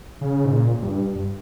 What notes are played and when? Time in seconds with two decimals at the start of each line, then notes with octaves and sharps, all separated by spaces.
0.21 C#3
0.45 G#2
0.51 A#2
0.82 G2